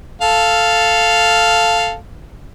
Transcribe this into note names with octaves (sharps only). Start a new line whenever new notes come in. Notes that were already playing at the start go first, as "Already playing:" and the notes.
A4 F5